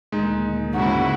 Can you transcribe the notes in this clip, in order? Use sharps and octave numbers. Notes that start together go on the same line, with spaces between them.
D2 A#2 D#3 G#3 D#4
G#2 C#3 E4 F#4